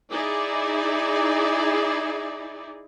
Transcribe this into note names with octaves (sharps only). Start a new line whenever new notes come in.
D#4 E4 G#4 D5